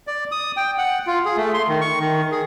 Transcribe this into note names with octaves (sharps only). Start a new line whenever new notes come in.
D5
D#6
G5
F#5
F4
G#4
A3
C6
D#3
C#6
D#3
G#4